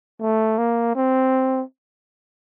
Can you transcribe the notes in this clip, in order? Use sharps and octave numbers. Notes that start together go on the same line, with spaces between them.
A3
A#3
C4